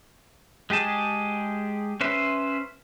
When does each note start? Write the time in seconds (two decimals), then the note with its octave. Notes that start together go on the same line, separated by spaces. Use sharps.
0.70 G#3 G4 G#4 A5
2.01 C#4 B4 C5 E5